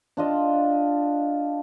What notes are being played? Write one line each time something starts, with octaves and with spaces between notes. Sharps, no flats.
D4 F4 D#5